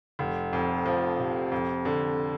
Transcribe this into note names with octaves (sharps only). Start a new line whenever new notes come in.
F1
F2
F3
C3
F2
D3